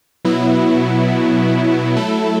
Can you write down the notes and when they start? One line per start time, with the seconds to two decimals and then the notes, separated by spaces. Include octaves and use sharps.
0.25 B2 F#3 B3 E4
1.96 F#3 A3 E4 A4